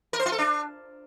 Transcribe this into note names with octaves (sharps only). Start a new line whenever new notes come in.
A#4
C5
F4
A4
D4